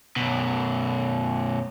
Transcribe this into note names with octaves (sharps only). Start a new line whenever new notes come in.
F#2 B2